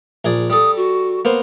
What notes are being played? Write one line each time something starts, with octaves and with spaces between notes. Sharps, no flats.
A#1 G#4 D5
G3 A4 D#6
F#4
A#3 B3 C5